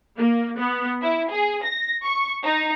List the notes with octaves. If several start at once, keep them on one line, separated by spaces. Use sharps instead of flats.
A#3
B3
E4
G#4
A#6
C#6
D#4